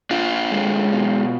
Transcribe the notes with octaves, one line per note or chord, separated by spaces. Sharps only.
D4 F4
G#3
B2